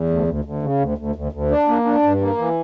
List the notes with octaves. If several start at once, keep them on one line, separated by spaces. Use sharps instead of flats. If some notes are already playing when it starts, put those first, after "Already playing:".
Already playing: E2
D2
D2
D2
C#3
D2
D2
D2
D2
D4
A#3
D4
G2
A#3
E3